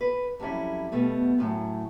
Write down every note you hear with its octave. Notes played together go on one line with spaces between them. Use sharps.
B4
F2 F#3 G3 C#4 E4
B2 G3 A3 B3
F#2 A2 F#3